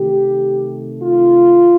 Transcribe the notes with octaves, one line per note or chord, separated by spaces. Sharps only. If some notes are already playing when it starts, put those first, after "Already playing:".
Already playing: C3 D#3 A3 G4
F4